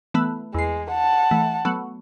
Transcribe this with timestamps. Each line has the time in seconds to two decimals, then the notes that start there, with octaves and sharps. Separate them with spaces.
0.14 E3 A3 B3
0.54 E2 G#3 C7
0.91 F#5 A5
1.31 E3 A3
1.65 F#3 A3 B3